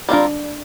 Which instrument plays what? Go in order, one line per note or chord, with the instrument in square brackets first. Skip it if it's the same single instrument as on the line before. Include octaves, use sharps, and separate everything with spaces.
[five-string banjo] G3 C4 F4 A#4 [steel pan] D4